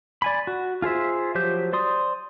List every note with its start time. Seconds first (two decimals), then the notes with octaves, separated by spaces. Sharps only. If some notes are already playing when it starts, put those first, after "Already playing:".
0.22 D5 G#5 B5
0.47 F#4
0.82 F4 G#4 C5 E5
1.35 F3 F#3 G4 C5 G6
1.73 C5 D5 C6 D#6